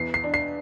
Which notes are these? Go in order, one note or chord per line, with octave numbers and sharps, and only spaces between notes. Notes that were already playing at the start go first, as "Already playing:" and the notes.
Already playing: E2 C7
C7
D4
C7